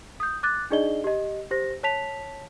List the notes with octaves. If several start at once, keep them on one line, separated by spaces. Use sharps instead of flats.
D#6 G6
D6 F#6 A6
D4 D#4 G#4 D5 D#5 G7
G4 D#5
G4 C5 A#6
C#5 A5 B6 F7